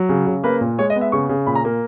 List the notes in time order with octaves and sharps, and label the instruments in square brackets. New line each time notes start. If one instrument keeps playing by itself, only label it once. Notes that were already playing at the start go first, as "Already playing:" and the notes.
Already playing: [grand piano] F#3
C#3
C#3
A#3 B4
A#2
G#3 C#5
D#5
B3
E5
C#3 C#6
C#3
A#2 B5
A#5
A#3